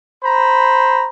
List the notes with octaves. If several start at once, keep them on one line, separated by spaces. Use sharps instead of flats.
C5 A#5 B5